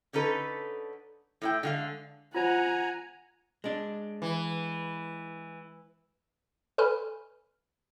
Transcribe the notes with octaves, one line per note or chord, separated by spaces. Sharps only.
D3 C#4 D#4 A4 B4
A2 E4 G5
D3 G#3 F5
F4 C5 F#5 G#5 A#5
G#3 D4
E3
A4 B4 G#5 B5 F6